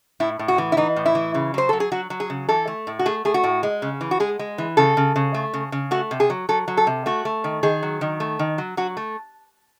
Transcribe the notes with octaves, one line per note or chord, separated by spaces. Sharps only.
A2 E4
A2
F#4
E3
E4
E3 D#4
A2
E4
E3
C#3
F#3 C5
F#3 A4
G#4
F#3 F#4
F#3
G#4
C#3
E3 A4
A3
A2
F#4
A3 G#4
A3 G#4
F#4
A2
G#3
C#3
E3
F#4
G#3 G#4
G#3
E3
C#3 A4
C#3
C#3
A3
C#3
C#3
A3 F#4
C3
G#4
F#3
F#3 A4
F#3
A4
C3
A3 F#4
A3
D#3
D#3 G#4
F#3
D#3
A3
D#3
F#3
F#3 F#4
A3